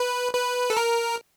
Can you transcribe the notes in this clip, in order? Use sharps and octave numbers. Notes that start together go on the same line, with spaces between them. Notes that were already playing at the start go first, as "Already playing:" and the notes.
Already playing: B4
B4
A4
A#4